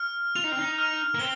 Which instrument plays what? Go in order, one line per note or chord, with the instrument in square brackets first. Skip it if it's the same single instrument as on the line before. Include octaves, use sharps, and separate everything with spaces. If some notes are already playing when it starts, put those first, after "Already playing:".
Already playing: [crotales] F6
[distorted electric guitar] F4 [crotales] F7
[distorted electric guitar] D#4
C4
D#4
[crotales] F6
[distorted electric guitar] A#3
[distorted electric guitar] C4 [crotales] G7